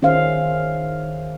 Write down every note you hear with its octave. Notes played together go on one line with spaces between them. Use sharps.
D#3 C#4 G#4 C5 E5 F5